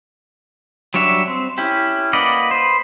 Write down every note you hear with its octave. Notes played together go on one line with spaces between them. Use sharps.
F#3 G3 D4 C#5 E5
C4
C#4 E4 G4
A#3 B4 D5 D#5 F#5
B4 C5